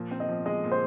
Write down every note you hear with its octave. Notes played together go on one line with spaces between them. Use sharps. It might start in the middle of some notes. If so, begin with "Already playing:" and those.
Already playing: A#2 F3
C4
D#5
F3
G#3 D#5
A#2
C5